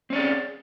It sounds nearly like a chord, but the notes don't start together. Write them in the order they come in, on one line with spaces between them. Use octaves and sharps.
C4 C#4 D5 G#4